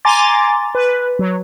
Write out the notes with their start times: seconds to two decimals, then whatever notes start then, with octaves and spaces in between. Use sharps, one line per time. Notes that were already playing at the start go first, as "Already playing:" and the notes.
0.05 G#5 A#5 C6 D6 A6
0.75 B4
1.19 F#3